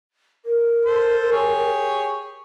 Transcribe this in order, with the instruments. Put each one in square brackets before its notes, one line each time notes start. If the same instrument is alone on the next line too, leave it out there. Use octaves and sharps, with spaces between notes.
[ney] A#4
[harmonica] A4 C5
G4 G#4 C#5